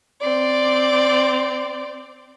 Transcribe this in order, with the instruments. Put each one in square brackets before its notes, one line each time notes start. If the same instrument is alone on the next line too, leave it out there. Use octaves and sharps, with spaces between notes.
[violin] C4 D5